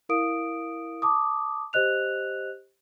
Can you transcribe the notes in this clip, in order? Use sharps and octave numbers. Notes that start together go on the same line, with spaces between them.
E4 A#4 F5 D#6 D7
A5 D6 D#6
G4 C5 D#5 F#6 F7